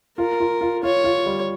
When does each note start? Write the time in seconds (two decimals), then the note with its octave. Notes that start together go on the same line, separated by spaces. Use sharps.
0.18 F4 A#4
0.40 F4
0.61 F4
0.83 F4 C#5
1.04 F4
1.26 G3